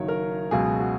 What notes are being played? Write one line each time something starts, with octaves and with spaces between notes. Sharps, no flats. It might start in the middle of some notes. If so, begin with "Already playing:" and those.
Already playing: F#1 F#2 D#3 F#3 C#5
A#4
C#2 B2 F#3 G#4
F#4